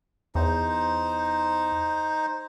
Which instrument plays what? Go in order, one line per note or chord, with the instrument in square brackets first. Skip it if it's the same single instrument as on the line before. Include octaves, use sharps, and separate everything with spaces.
[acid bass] E2 [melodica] D#4 C5